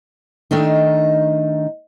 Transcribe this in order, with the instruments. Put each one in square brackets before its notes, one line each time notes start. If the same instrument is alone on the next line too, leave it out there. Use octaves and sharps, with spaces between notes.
[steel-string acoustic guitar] D#3 A3 D4 D#4